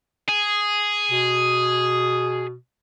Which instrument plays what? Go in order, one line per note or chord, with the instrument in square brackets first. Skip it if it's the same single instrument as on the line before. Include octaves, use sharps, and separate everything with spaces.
[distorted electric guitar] G#4
[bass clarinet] B2